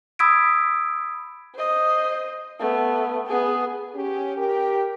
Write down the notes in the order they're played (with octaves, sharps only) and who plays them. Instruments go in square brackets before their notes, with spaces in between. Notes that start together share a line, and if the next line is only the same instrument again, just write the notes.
[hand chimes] B5 D#6 E6 G#6 B6 D7
[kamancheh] C5 D#5
A3 B3
B3 G#4
[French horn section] C#4 G4
G4 A#4